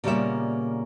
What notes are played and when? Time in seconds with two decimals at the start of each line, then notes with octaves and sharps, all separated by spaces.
0.04 A#2 C#3 G3 A#3 B3 E5